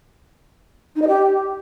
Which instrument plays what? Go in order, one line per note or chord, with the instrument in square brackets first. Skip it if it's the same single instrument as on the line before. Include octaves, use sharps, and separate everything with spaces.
[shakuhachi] D#4
D#5
G4